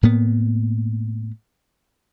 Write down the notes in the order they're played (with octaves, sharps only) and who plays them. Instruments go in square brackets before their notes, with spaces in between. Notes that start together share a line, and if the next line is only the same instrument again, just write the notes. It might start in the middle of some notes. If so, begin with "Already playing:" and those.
[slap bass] A2 A#3 B3